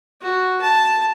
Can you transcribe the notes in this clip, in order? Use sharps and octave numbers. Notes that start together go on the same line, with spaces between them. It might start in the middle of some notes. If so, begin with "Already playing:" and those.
F#4
A5